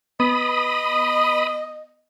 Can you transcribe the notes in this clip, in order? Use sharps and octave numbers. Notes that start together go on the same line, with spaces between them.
B3 D#5 B5 D#6